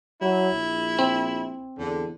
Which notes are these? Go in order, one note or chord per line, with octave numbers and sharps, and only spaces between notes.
F#3 E4
A#1
C4
E2 D3